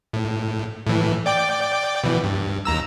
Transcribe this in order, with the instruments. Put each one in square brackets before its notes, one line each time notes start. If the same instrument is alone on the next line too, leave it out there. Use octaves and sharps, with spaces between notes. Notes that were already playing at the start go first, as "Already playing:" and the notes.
[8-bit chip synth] A2
A2 E3
D5 G5 D6
B2 E3
G2
D#2 A#5 E6